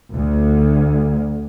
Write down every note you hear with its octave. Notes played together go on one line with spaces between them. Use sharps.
D2